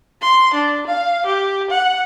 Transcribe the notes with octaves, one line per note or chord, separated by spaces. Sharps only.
C6
D4
F5
G4
F#5